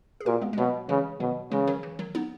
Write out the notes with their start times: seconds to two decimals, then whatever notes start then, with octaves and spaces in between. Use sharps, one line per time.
0.20 G#4
0.26 A#2 F#4 A#4
0.41 G#3 B3
0.53 G#3
0.58 B2 F#3 A#3
0.89 C#3 E3 G#3
1.20 B2 D#3 F#3
1.52 C#3 E3 G#3
1.67 D#3 F#3
1.83 E3
1.99 D#3 F#3
2.15 B3 D#4